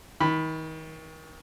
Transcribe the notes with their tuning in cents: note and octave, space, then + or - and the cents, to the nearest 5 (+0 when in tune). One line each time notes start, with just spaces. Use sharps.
D#3 +35 B5 +0